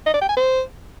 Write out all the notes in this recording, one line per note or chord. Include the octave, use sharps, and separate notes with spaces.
D#5
D5
G5
G#5
C5